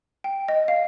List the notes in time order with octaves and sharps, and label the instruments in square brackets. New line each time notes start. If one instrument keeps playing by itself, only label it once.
[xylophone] G5
D#5
F5